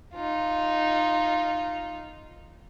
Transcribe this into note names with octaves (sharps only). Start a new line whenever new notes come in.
D#4 F4